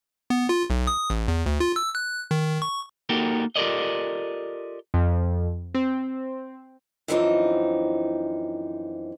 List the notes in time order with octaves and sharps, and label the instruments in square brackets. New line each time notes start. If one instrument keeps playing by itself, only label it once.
[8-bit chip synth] B3
F4
B1
D#6
A1
E2
D2
F4
E6
F#6
D#3
C#6
[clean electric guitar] A#3 D#4 F#4 G4 A4 A#4
F4 G4 A4 A#4 D5 D#5
[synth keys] F2
C4
[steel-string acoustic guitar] F#2 D3 E3 F3 C4 D#4